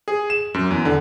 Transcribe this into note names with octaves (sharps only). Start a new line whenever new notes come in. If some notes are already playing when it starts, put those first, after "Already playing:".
G#4
E7
F#2
E2
D3